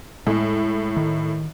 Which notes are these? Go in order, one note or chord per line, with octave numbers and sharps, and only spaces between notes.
A2 G#3
D#3